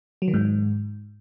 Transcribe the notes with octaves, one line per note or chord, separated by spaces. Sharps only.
F#3
D#3
G#2